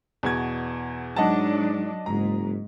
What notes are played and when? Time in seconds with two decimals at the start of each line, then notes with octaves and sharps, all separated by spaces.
0.23 E2 B2 G#6
1.16 G#2 F#3 D4 D#5 F#5 A5
2.06 F#1 G#2 A#5